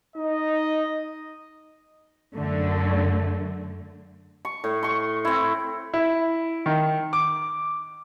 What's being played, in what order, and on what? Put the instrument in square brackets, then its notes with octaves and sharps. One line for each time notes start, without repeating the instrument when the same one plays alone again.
[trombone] D#4 [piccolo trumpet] D#5
[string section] F#2 D3 A3
[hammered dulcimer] C#6
A2
C6 C#6
C4 E4
[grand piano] E4
D#3
D6